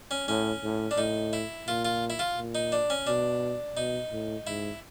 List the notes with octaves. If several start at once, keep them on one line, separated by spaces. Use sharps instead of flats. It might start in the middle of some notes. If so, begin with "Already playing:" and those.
C#4
A2 C#4
A2
D4
A2 D#4
E4
A#2 F4
F4
E4
F4
A#2
D#4
D4
C#4
B2 D4
B2 D#4
A2
G#2 E4